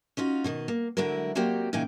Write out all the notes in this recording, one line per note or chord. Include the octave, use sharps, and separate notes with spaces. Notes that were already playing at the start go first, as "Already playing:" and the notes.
C#4 D#4 F4 F#4
B2 D#3 D#5
A#3
D3 F#3 G#3 E4 A#4
F#3 A#3 C4 F#4 G4 D5
A#2 C#3 E3 D#4 G5 G#5